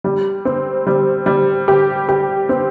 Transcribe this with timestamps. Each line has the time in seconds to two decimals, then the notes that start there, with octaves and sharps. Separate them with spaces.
0.04 G3
0.45 C4
0.87 G3
1.26 G3
1.68 G4
2.09 G4
2.49 C4